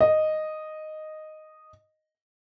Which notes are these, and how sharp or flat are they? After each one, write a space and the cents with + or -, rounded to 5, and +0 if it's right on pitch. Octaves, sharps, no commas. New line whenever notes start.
D#5 -5